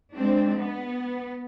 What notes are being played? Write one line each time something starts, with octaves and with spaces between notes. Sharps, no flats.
G#3 C4 D4
B3